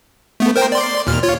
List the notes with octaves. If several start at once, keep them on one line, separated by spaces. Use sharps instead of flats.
A3 B3
A#4 C5 G5
D5 C6
D#2 A#2 F6
F4 C#5